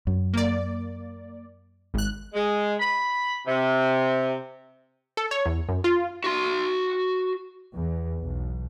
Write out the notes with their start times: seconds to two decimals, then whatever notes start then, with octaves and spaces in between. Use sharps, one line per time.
0.07 F#2
0.34 A#3 D5
1.94 G#1 F#6
2.33 G#3
2.79 B5
3.46 C3
5.17 A4
5.31 C#5
5.46 E2
5.69 F#2
5.84 F4
6.24 F#4 C6
7.75 E2
8.20 B1